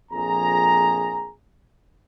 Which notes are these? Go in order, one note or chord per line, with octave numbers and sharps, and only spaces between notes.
A#1 F2 G#4 A#5